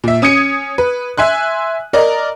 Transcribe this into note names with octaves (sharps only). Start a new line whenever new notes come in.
A#2 E5
C#4 D#6 G#6 C#7 D#7
B4
E5 G#5 C6 F#6
A#4 D5 D#5 A#5